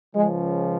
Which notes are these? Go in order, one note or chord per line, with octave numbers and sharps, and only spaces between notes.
C#2 C#3 F3 G#3